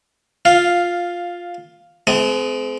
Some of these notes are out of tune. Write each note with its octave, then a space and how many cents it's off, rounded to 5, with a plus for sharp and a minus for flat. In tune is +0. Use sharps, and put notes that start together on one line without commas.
F4 +10 F5 +0
G#3 +45 C4 -35 D#6 +0